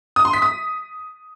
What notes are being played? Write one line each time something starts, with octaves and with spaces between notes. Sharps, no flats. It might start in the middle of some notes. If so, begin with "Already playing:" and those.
D#6
C6
B6
D#6